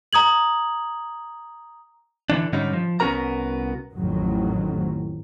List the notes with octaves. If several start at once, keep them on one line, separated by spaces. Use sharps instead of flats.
A#5 D#6 G#6 F#7
D3 E3 D4
G#2 D3 G3 C#4 D#4
F3
C2 B3 C#4 F#4 A#4 A#5
A1 F2 D#3 F#3